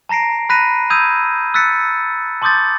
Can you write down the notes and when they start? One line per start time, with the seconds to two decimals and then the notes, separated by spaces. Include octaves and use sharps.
0.09 A5 A#5 A#6 C7 D7
0.49 B5 F#6 A#6 B6 D#7
0.90 B5 D#6 E6 G6 G#6 D#7
1.54 E6 F#6 A6 B6 C#7
2.42 A5 C6 D6 D#6 G6 A6